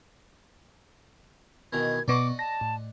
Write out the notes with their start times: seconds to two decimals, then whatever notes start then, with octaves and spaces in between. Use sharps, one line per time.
1.73 B2 D#3 E3 G#6
2.08 B2 B3 D5 D#5 F#5 C#6 D6
2.39 A5 A#6
2.61 A2